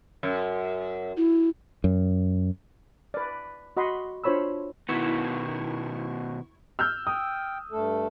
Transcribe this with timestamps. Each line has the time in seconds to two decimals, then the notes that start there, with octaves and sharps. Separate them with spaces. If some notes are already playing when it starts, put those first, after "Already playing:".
0.23 F#2
1.17 E4
1.84 F#2
3.14 B4 D5
3.77 F#4 D#5 F#5 B5 C6
4.24 D4 F4 C5 C#5 B5 E6
4.89 B2 D#3 B3 E4 C#6 G#6
6.79 E6 F6 G6
7.07 G5 D#6
7.72 G2 A3 A4